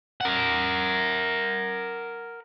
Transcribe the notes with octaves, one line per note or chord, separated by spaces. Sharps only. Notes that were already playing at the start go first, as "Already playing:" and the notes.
A#4 F#5